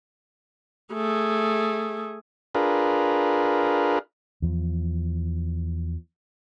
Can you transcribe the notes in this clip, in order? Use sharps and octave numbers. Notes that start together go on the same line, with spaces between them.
A3 G#4
D4 F4 G#4 A#4 B4
E2 F3